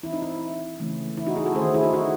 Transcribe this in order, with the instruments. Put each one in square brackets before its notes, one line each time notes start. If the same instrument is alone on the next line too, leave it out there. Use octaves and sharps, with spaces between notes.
[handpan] E3 C4 E4
D#4
E4
D#4
C#3 E3 A3 C#4
E4
D#4 F#4
E4 G#4
F#4 A4
D#3 A3 C#4 G#4 C5
E4 G#4
D#4 F#4
D#4 F#4